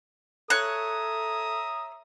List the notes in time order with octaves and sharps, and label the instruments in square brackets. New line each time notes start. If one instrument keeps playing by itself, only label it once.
[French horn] A4 [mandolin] C#5 F#6 [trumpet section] E5 A#5 D#6